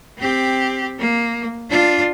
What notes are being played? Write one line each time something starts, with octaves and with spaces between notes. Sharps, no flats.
C4 G4
A#3
D4 F4